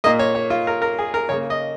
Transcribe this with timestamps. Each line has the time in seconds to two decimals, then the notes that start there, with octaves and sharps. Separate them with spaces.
0.04 A#2 A#3 D#5
0.19 C#5
0.35 C#5
0.50 F4
0.67 A#4
0.82 A#4
0.99 G#4
1.14 A#4
1.29 C#3 A#3 C#5
1.50 D#5